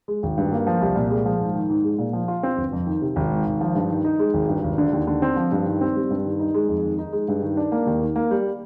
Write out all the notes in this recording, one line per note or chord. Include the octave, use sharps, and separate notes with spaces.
G#3
G#1
G2
A#3
F3
C2
A#2
G#3
F3
G#2
D#3
G#2
G#3
A#2
F3
F4
C4
G1
F2
D#3
C3
G#1
G#2
G#1
F3
G2
D#3
D#4
G#3
G#1
G2
G#1
D3
D#2
D3
C4
F3
G2
D#3
C4
G3
G2
D#3
D#4
G#3
F2
D#3
D#4
G#3
G2
D#3
D4
A#3
D#2
D#3
A#3
G3